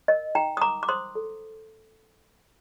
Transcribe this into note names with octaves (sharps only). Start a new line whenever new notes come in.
A#4 D#5
D#4 G5 A#5
D#6
A#4 A#5 D6
D6
C5 C6 D#6
A4